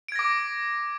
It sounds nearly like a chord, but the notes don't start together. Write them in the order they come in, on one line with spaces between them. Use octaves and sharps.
D7 G#6 A#6 D6